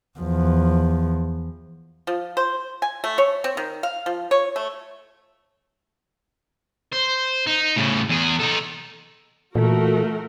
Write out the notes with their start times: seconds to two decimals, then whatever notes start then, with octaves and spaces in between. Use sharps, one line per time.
0.19 E2 F3
2.07 F3
2.37 C5
2.82 G#5
3.04 A3
3.18 C#5
3.44 C4
3.57 D#3
3.83 F5
4.06 F3
4.31 C#5
4.56 A3
6.93 C5
7.47 D#4
7.76 A2 C#3
8.09 E2 G#4
8.39 D#4 A4
9.55 A#2 E3 A3 F4 F#4 A4 A#4